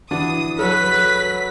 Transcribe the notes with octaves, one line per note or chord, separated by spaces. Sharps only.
E3 D4 F#4 D#6
F#3 A4 B4 B6